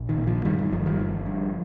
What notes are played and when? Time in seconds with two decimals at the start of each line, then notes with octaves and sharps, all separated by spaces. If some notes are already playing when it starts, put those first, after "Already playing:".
Already playing: A#1
0.09 D#3
0.18 A#2
0.27 F3
0.45 G2 D#3 G3
0.59 D#3
0.72 G1 F3
0.86 D#3 G3
0.99 G1 F3
1.26 G2